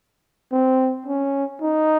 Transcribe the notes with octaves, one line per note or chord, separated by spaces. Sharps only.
C4
C#4
D#4